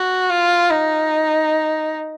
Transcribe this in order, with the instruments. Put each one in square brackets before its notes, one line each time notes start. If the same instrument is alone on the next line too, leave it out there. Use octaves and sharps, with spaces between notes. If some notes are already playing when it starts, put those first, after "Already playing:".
Already playing: [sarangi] F#4
F4
D#4